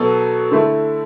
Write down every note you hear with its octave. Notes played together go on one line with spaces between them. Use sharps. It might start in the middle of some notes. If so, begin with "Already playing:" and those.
Already playing: B2 F#3 B3 A4
D3 A3 E4